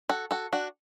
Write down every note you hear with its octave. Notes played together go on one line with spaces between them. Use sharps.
F#4 A4
F#4 A4
D4 F#4